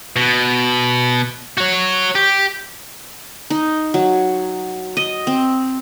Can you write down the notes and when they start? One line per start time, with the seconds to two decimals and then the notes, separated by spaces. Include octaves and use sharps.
0.16 B2
1.58 F#4 C#5
2.15 G4
3.50 D#4
3.94 F#3
4.97 D#5
5.27 C4